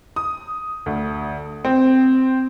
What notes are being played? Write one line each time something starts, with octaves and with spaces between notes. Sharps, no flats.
D#6
D2
C4